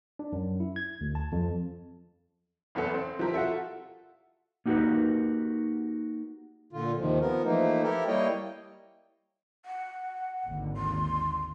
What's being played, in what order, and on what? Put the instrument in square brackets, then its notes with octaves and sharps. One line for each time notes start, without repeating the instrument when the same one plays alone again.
[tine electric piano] D4
F#2
E4
G#6
D2
A5
F2
[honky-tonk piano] F#1 E2 B3 A4
C4
F3 C4 E4 G4 A#4
F4 F#4 A4 E5
[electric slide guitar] A#3 D#4 F#4 G4 A#4 B4
[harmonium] A#2 D3 F4
D#2 C3 D#3 F3
F3 B3 A#4
E3 F3 A3 A#3 D#4
E4 G4 A4 A#4
G3 A#3 E4 C#5 D#5 G5
[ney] F#5
[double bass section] G#1 D#2 D3
[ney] C6